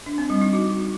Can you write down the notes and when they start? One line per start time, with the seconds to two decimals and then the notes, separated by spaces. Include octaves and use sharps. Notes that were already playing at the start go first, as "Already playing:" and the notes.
0.06 D4
0.18 C4
0.30 G3
0.41 D#4
0.53 F#4